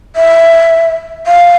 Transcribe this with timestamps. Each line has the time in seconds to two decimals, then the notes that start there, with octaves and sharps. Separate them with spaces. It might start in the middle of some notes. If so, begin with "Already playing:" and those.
0.16 E5
1.27 F5